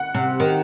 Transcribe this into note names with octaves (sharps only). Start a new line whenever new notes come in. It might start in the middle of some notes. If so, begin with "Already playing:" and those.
Already playing: F#5
C3
D#3